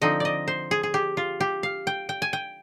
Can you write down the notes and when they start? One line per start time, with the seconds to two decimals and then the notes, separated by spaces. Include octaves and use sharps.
0.01 D3 F3 C4 D#4 D#5
0.20 D5 D#5
0.48 C5
0.71 G#4
0.83 G#4
0.94 G4
1.17 F4
1.40 G4
1.63 F5
1.87 G5
2.09 G5
2.22 G#5
2.33 G5